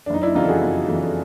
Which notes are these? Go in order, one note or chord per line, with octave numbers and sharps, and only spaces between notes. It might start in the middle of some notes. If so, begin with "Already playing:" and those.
D4
F#1 D#4
D4 E4
F2 C#3 E3 D#4 F4
A4
F#4 G#4
F#1
F2 C#3 E3